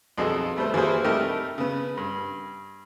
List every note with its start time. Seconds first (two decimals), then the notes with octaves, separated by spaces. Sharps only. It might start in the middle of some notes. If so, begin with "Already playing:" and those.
0.18 B1 F2 G#4 A4 D#5
0.56 G3 A3 B3 C5
0.74 E3 A#3 F#4 G#4 C5
1.04 C3 G3 A3 D#4 G4 A#4
1.58 C#3 B3
1.97 G2